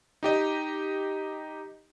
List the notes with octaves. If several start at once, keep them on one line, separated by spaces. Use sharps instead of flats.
D#4 G4 D#5